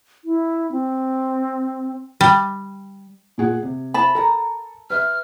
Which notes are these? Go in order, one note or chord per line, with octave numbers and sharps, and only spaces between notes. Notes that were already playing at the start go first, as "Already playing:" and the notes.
E4
C4
G3
A#2 G#4 F#5
C3
E4 C5 E5 A5 B5
A4 A#4 G5 A#5
B4 E5 F6